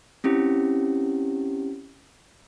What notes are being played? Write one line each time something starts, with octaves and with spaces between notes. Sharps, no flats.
C4 C#4 E4 G4